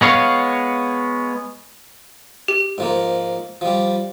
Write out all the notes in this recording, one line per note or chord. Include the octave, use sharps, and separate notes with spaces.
G#3 B3 C#5 F5
G4
G#2 F3 A#3
F3 G3